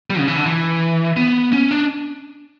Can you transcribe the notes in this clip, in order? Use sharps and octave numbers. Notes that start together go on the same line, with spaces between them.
G3
C#3
E3
D3
E3
B3
C#4
D4